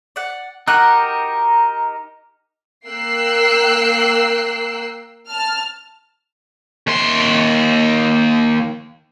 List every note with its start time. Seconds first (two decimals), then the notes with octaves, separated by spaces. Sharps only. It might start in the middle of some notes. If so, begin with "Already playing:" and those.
0.16 D5 F#5
0.68 D#4 F#4 G4 A#4 F#6
2.89 A#3 G5 E6 F#6 C7
5.28 A5 F6
6.87 D#2 C6